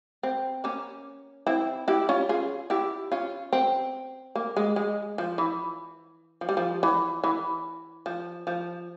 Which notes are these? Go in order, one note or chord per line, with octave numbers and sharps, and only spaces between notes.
C4
A#3 C#4
C4 E4
E4 G4
C#4 F4
F4 G#4
E4 G4
C#4 F4
C4
A#3
G#3
G#3
F3
E3
F3
G3
F3
E3
E3
F3
F3